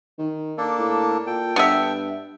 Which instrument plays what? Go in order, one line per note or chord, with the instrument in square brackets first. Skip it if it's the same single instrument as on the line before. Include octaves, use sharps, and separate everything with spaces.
[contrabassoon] D#3
[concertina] A#3 D4 A4
[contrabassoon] A2
[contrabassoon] A#2 [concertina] A4 G5
[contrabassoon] G2 [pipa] B3 E5